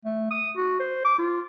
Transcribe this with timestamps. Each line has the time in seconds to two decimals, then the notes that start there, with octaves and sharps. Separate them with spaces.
0.05 A3
0.31 D#6
0.56 F#4
0.80 C5
1.05 D6
1.18 F4